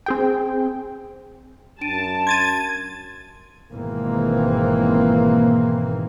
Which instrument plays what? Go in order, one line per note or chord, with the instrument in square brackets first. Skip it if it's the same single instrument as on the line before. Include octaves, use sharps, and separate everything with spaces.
[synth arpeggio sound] C4 G#4 G5
[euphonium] F#2 [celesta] D4 D7 D#7 [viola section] A5
[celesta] C6 [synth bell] G#6 A6 D#7
[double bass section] G#1 G#2 B2 E3 A#3 C4